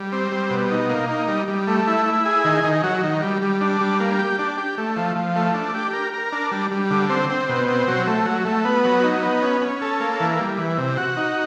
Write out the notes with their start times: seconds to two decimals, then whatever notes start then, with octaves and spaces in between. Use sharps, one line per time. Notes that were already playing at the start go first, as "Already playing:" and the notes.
Already playing: G3
0.12 C4
0.32 G3
0.50 B2
0.71 D#4
0.89 A#3
1.09 D#4
1.28 G3
1.48 G3
1.67 A3
1.87 E4
2.06 E4
2.25 G#4
2.44 D#3
2.64 D#3
2.83 F#3
3.03 D#3
3.22 G3
3.42 G3
3.61 D4
3.81 G3
4.00 A#3
4.19 G4
4.39 D4
4.58 G4
4.78 A3
4.97 F3
5.16 F3
5.36 A3
5.54 D4
5.75 G4
5.93 A#4
6.13 A#4
6.32 D4
6.51 G3
6.71 G3
6.90 D3
7.10 C4
7.30 C4
7.49 B2
7.68 C4
7.88 F#3
8.07 A3
8.26 F#3
8.45 A3
8.65 B3
8.85 F#3
9.04 D#4
9.23 B3
9.42 C#4
9.61 C#4
9.81 A4
10.00 A#3
10.20 E3
10.40 G3
10.58 E3
10.78 C3
10.97 F#4
11.17 D#4